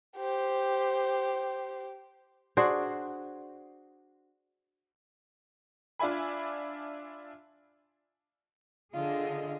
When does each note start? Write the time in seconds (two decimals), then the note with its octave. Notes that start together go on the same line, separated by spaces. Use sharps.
0.17 G4 C5
2.57 D4 F#4 G#4 C5
5.99 D4 F4 D5 E5 G#5 B5
8.94 D3 F4 G#4 D#5